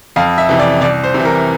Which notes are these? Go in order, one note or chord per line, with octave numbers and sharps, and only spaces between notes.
F2 F5
E5
C3 E3
D5
C2 D5
C5
C3
E3
A#4